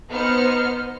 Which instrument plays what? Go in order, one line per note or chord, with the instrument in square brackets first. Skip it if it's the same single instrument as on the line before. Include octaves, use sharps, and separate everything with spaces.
[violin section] B3 D#4 C5 F6 C#7